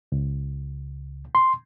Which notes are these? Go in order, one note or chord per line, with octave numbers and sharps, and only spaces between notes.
C#2
C6